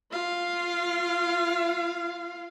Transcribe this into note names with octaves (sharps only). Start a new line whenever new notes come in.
F4 F5